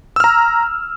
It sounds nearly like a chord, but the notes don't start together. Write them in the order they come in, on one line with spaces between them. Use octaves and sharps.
E6 F6 A#5